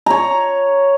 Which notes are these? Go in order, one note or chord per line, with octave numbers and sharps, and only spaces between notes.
C#5 A#5